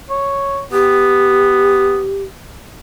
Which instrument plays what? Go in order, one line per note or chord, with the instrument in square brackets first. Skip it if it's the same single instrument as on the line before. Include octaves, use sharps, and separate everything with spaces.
[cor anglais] C#5
[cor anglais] B3 [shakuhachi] G4